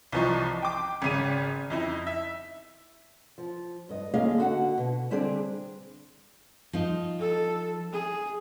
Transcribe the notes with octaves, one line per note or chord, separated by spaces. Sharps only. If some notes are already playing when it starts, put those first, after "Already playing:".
C2 E3 F3 D#5 C#6
G5 D6
G#1 C#3 D#7
F2 D#4 E4
E5
F3
G2 D#5
D3 A#3 C#4 G#4 D#5 F5
D3 F#4 F#5
B2
D3 G3 C4 D4 G#4
F3 D#4
A4
G#4